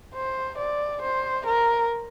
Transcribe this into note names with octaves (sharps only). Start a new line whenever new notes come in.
C5
D5
C5
A#4